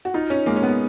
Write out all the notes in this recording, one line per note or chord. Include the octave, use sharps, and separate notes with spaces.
F#4
D#4 F4
C#4
G#3 A#3
C#4
B3